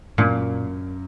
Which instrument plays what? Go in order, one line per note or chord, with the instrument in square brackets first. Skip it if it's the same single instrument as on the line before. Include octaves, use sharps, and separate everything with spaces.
[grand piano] F#2 [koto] A#2